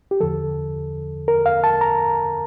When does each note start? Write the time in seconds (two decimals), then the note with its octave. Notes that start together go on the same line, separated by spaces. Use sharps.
0.11 G4
0.20 E2 D3 F3 A4
1.28 A#4
1.46 F5
1.64 A5
1.81 A#5